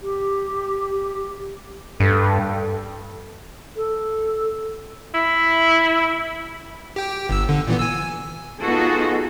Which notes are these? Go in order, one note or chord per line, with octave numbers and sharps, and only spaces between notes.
G4
G2 A4
A4
E4
G4 G5
G1 E6
D3
A#2 E3 B3
G#5 E6
B3 D#4 F4 F#4 G#4 A4